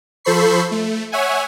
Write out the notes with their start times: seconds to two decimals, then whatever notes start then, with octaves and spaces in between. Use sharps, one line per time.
0.25 F3 A4 C5 B5 C#6 C7
0.71 A3
1.12 C#5 E5 F#5 G#5